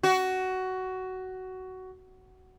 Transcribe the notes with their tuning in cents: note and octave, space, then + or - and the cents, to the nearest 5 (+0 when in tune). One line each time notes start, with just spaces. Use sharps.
F#4 +15